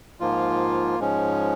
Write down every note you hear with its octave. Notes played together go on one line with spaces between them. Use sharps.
G#2 F3 A#3 F4
G#2 F3 G#3 C#4